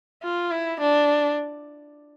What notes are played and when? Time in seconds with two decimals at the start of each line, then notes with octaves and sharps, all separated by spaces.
0.23 F4
0.51 E4
0.80 D4